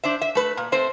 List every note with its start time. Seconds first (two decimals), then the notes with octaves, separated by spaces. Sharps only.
0.04 D4 C5 E5
0.21 E5
0.35 A3 B4
0.57 A#2
0.72 A3 C4 C5